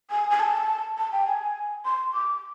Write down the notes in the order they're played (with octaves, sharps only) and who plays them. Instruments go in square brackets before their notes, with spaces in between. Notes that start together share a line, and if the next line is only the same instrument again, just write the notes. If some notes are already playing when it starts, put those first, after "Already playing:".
[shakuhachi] G#5
G#5
A5
A5
G5
G#5
C6
D6